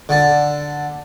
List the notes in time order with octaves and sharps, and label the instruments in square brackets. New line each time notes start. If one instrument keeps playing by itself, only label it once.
[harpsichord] D3 A5